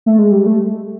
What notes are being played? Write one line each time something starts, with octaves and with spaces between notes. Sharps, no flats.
A3
G#3
G3
A3